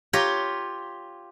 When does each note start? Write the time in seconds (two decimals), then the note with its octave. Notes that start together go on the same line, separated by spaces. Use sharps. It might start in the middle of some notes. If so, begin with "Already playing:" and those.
0.13 F4 G4 C#5 A#5